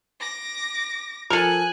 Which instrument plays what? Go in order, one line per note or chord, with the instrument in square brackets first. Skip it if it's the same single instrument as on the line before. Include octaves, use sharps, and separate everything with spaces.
[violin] D6 A#6
[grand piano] F3 [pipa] A4 A#4 [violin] G#5 F#6